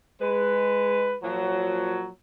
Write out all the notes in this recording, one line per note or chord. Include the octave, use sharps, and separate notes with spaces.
G#3 B4
A#2 F3 F#3